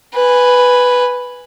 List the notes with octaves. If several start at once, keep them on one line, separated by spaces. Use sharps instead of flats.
B4 G#5